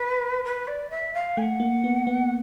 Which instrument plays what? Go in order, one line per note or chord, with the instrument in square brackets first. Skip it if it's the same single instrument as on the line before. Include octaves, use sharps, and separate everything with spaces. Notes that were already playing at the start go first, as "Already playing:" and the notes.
Already playing: [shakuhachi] B4
B4
D5
E5
F5
[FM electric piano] A3 [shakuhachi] G#5
[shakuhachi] F#5
[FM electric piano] A#3
B3
B3